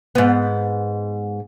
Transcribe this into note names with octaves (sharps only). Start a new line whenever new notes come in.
G#2 B3